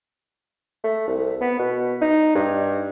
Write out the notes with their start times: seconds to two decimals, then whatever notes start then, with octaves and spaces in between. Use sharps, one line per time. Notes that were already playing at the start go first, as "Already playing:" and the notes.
0.84 A3
1.07 C2
1.41 B3
1.59 B2
2.01 D#4
2.35 G2